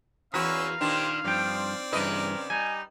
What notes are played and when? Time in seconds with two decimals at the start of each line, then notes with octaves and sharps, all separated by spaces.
0.34 E2 C#4 F#4 A#4 B4 F5 E6
0.81 A#2 D#3 D4 G4 C5
1.25 G2 F3 C4 D5 G5
1.93 G2 C#3 E3 A#4 B4 D#5
2.50 G3 D#4 G#5